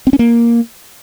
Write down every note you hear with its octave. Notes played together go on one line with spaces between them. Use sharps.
C4
C#4
A#3